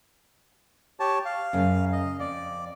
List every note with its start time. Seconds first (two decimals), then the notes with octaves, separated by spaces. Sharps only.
1.00 G4 C#5 A5
1.25 F5
1.53 F#2 C#3
1.92 D#5
2.20 F2 D5